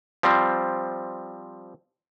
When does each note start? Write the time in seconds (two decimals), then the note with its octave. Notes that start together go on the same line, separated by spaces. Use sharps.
0.23 F3 G3 C4